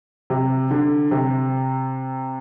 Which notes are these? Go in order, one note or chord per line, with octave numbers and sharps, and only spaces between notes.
C3
D3
C3